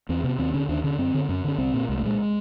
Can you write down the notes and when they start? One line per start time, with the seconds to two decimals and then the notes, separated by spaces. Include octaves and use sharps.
0.09 E2 C4
0.24 C3 B3
0.39 D#2 C4
0.54 D3 C#4
0.69 D#2 D4
0.84 D3 C#4
0.98 F#2 C4
1.14 D3
1.24 C4
1.29 F#2 C#4
1.44 D3 C#4
1.58 C2 C4
1.74 A#2
1.88 C2 G#3
1.98 A3
2.03 A#2 G#3